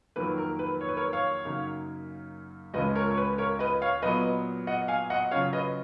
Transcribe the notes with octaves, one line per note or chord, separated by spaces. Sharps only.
F2 D#3 F#3 A#3 B4
A#4
B4
C#5
B4
A#4 C#5
C#5 F5
F#2 C#3 F#3 A#3 D#4
C#2 C#3 F3 G#3 C#4 B4 D#5
A#4 C#5
C#5
B4
A#4 C#5
B4 D#5
C#5 F5
A#2 F#3 B3 B4 D#5
D#5 F#5
F5 G#5
D#5 F#5
C#3 F#3 C#4 F4 C#5 F5
B4 D#5